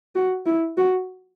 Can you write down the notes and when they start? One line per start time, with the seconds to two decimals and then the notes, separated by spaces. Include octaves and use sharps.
0.15 F#4
0.46 E4
0.77 F#4